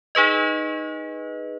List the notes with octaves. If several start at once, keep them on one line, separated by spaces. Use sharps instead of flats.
D#4 G#4 B4 D#5